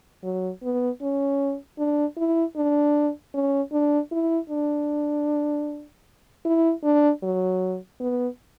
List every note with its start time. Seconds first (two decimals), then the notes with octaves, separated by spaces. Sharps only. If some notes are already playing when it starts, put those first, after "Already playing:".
0.24 F#3
0.63 B3
1.02 C#4
1.78 D4
2.17 E4
2.56 D4
3.35 C#4
3.73 D4
4.12 E4
4.50 D4
6.45 E4
6.84 D4
7.23 F#3
8.00 B3